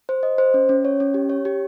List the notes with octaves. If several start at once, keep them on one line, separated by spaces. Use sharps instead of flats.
C5
D#5
C5
C#4
C#4
C#5
C#4
G4
C#5
G4